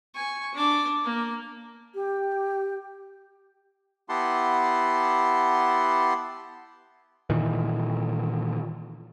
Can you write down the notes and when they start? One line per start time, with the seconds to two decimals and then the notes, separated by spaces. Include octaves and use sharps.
0.14 G#5 C#6
0.55 D4 D6
1.04 A#3
1.95 G4
4.09 B3 E4 G4 F#5 A5 C6
7.30 A#2 D#3 E3